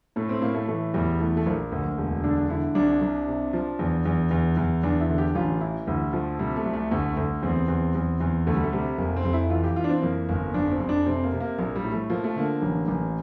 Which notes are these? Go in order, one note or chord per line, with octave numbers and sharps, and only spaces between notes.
A2 A3
C4
A2 A#3
A3
E3 A3
E2 G3
E3 A3
A3
A#1 A#3
D2
E1
D3 D4
D3 E4
C2 D4
C2
C3
F3
E2
E2
E2
E2
E2 D4
E4
D3
G4
A1 F4
E3 E4
D2 G3
F3 A3
C3 G3
A3
C2
A3
D2 A3
D2
E2 C4
E2
E2
E2
D2 A3
G3
A3
C3 G3
F1 A#3
C4
F1
E4
E3 F4
G4
E3 F4
D4
C4
F2 A#3
G1 A#3
F2 D4
C4
F1
D4
C3 C4
A#3
C3
A#3
A#1 A#3
G3
A2
A3
F3 A#3
A3
D3 A#3
A1
A1